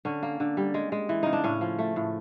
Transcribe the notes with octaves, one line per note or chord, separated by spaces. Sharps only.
D3 C#4
A#3
D3
G3
G#3
G#3
E3
C#3 D#4
D4
A2 C#4
F3
A3
A2